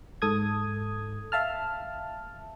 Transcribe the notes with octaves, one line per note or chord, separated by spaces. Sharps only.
G#2 A4 D#6 G#6
E5 F5 A5 F6